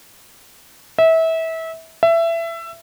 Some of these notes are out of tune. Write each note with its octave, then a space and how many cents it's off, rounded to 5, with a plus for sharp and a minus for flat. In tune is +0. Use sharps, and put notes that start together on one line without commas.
E5 -25
E5 +20